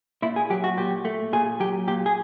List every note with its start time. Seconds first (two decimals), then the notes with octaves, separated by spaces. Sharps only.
0.22 A#2 E4
0.36 G#4
0.50 F#3 G4
0.64 F#4
0.77 A#2 G4
1.05 A3
1.33 A#2 G#4
1.60 F#3 G4
1.87 A#2 G4
2.06 G#4